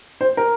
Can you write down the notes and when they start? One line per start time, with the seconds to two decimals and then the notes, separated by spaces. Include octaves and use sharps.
0.21 C5
0.37 A#4